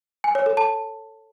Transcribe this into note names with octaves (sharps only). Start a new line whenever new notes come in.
G#5
C#5
A4
A5